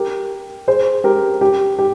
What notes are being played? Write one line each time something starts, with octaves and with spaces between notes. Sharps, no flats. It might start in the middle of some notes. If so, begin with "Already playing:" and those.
Already playing: G4 A#4
G#4 C5
G4 A#4
G4
G4